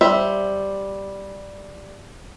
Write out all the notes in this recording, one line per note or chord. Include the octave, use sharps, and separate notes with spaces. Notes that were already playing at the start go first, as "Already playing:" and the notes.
G3 C5 E5